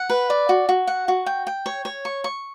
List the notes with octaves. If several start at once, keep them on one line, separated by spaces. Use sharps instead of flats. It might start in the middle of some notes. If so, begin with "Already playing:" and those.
Already playing: F#5
B4
D5
F#4
F#4
F#5
F#4
G5
G5
C#5
C#5
C#6
C#6